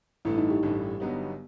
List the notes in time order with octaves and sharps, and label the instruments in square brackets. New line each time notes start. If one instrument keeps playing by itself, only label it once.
[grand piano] A1 G2 E3 A3 [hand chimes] E4
[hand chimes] D#4
G4
[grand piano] A1 G2 E3 A3
G1 G2 F#3 B3 D#4